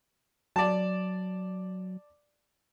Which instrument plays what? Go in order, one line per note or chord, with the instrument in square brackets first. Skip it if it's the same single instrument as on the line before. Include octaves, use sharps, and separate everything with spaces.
[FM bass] F#3 [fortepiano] D5 A5